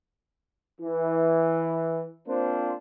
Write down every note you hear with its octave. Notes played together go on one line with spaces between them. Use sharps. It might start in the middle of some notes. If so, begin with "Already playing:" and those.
E3
A#3 C4 D4 F4 C5